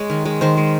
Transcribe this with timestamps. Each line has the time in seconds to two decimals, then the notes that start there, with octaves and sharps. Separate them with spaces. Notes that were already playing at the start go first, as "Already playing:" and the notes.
Already playing: G#3 C#5
0.10 D#3
0.25 G#3
0.41 D#3 C5
0.57 G#3